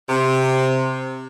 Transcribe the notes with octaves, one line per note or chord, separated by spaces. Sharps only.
C3